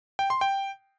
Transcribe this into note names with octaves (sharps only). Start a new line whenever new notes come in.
G5
C6
G5